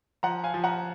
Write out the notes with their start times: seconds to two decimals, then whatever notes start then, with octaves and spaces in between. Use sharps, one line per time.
0.23 F3 F#5 A#5
0.44 F5 G#5
0.54 F3
0.64 F#5 A#5